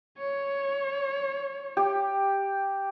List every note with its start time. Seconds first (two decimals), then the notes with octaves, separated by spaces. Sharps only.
0.18 C#5
1.77 G4